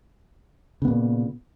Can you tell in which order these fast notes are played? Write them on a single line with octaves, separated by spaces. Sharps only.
C#3 B3 A#2